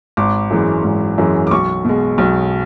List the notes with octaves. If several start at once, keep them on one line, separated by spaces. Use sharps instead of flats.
G#1 D6
F#2 E3 G#3
G#1
F#2 E3 G#3
D6
B1 C#6
B2 G#3
B1